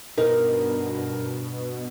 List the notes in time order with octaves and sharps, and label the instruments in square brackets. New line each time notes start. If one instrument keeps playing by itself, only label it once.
[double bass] G2 [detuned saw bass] B2 [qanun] D#4 [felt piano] A#4